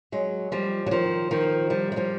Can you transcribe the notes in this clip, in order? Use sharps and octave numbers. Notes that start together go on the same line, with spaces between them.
F#3 G#3
F3 G3
F#3
D#3 F3
D#3 F3
F3 G3
G#3
F3 G3